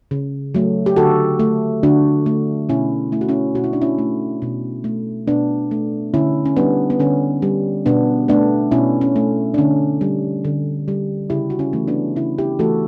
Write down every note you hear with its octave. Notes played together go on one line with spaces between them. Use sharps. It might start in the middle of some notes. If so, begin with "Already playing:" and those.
C#3
F#3 A3
G4
D3 F#4 A4
A3
D3 D4 F#4
A3
B2 C#4 E4
A3 E4
F#4
C#4 E4
B2 F#4
E4
D4
C#4 E4
A3
B2
A3
B2 B3 D4
A3
D3 C#4 E4
C#4
G3 B3 D4
B3
D3 C#4
G3
B2 B3 D4
A3 B3 D4
B2 C#4 E4
C#4
A3
D4
D3 C#4
G3
D3
G3
C#3 E4 G4
F#4
C#4 E4
E3 A3
B3 D4
C#3 C#4 E4
E4 G4
E3 A3 F#4 A4